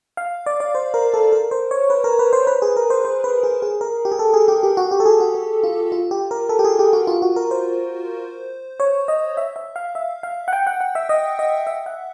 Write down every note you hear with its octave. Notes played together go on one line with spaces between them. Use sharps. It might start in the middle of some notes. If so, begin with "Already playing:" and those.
F5
D5
D5
C5
A#4
A4
A#4
C5
C#5
B4
A#4
B4
C5
B4
G#4
A#4
C5
C5
B4
G#4
G#4
A#4
G4
G#4
A4
G#4
G4
G4
F#4
G4
A4
G#4
F#4
G#4
F4
F4
G4
A#4
A4
G4
G#4
G4
F#4
F4
F#4
A#4
C5
C#5
D#5
E5
E5
F5
E5
F5
F#5
G5
F#5
F#5
E5
D#5
D#5
E5
F#5